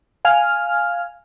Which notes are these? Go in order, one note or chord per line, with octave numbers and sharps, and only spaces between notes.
F5 G#5 F6